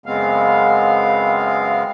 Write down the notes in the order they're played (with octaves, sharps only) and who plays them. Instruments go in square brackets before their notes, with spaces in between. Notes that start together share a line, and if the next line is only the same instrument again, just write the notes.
[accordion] F#2 C#3 G#3 B3 C4 F5